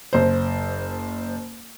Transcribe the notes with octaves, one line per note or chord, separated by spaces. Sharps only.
F#1 C5